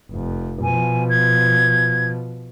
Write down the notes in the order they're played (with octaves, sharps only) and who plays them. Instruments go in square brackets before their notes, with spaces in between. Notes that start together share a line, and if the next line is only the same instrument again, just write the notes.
[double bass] F1 F2
[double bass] B2 F3 [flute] G#5
[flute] G#6